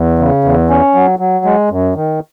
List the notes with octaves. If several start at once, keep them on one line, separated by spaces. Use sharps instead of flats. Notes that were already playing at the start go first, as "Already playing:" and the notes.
Already playing: E2
C#3
E2
C#4
F#3
F#3
G#3
F#2
D#3